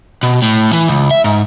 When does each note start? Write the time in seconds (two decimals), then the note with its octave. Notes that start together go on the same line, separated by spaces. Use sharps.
0.23 B2
0.42 A2
0.73 E3
0.88 C#2
1.11 E5
1.24 G#2